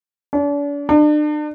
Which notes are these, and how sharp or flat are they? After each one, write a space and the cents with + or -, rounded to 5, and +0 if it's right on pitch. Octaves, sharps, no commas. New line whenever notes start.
D4 -40
D4 +40